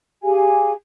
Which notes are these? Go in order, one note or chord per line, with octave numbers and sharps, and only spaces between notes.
G4 G#4 F5 G#5